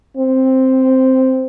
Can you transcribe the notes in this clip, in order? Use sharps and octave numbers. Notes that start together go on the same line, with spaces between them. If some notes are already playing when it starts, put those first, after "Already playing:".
C4